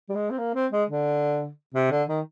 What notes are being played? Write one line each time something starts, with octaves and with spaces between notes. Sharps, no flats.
G3
G#3
C4
A#3
C4
G#3
D3
C3
D3
D#3